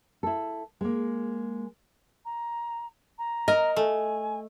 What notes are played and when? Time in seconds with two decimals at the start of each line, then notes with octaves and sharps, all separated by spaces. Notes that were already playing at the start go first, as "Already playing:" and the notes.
0.23 E4 A4
0.81 G#3 A#3
2.25 A#5
3.18 A#5
3.48 A#4 D#5
3.76 A3 G#5